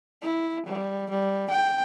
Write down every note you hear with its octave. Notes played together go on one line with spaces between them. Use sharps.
E4
G3
G3
G5